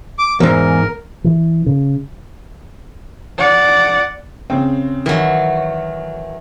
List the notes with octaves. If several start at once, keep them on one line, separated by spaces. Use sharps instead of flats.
D6
E2 G#2 A#4
E3
C#3
D5 F#5
C#3 C4
D#3 E3 F#3